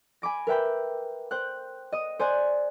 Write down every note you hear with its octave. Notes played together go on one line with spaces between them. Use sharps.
G#5 B5 D6 A#6
A#4 B4 E5 G5 B5
C5 G5 F#6
D#5 D#6
C5 D5 G#5 C6 F#6 G#6